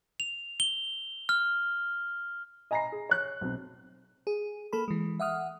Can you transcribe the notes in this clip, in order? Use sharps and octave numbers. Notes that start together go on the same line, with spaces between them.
F7
G7
F6
D#5 G#5 A#5 B5 A#6 C7
G#4
C#5 F#6
B1 C4
G#4
A#3 A4 B5
E3 G#3
E5 F#5 D#6 F6